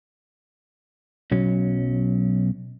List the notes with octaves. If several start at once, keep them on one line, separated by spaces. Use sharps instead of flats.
B1 F#3 C#4